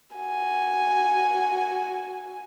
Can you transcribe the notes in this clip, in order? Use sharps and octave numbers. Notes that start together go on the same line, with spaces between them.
F#4 G#5